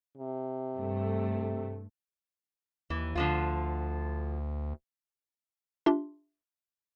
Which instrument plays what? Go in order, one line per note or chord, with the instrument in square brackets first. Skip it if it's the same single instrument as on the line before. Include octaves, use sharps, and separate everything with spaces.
[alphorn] C3
[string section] G2 A3
[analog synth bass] D#2 [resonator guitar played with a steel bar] E3
[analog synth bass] D2 [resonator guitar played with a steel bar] D3 F3 F4
[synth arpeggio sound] D4 F4 G4 E5 C6